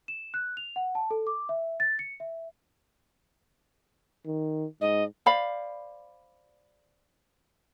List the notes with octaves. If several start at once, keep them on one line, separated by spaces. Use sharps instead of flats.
E7
F#6
F7
F#5
A5
A4
D6
E5
A6
C#7
E5
D#3
G#2 D#5
C5 D5 F5 B5